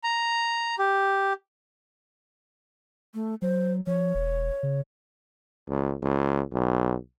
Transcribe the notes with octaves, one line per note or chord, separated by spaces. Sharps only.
A#5
G4
A3
F#3 C5
F3 C#5
E1
C#3
C#2
C#2
B1